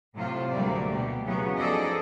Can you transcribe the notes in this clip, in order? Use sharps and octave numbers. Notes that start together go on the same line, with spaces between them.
A2 C3 F#3 F4 C5
D2 F#3 G3 A#3 D5
B2 G4
C#3 E3 F#3 B3 C#4
F3 D#4 G#4 A4 D5 D#5